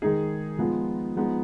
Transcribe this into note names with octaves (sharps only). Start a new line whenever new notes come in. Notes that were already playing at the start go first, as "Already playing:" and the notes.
D#3 G#3 D#4 G#4
F3 G#3 B3 F4
F3 G#3 B3 D#4